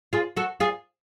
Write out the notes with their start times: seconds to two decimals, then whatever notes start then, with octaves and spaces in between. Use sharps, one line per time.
0.13 F4 G#4
0.37 F#4 A4
0.60 F4 G#4